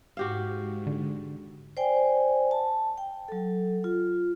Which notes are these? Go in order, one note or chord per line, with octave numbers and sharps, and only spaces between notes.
G#2 F#4 G4 F5
D3
C5 D5 G5 G#5
A5
G5
F#3 A4
F4